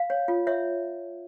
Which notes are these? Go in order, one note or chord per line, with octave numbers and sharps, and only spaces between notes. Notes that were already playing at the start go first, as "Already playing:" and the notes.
Already playing: F5
C#5
F4
C#5 E5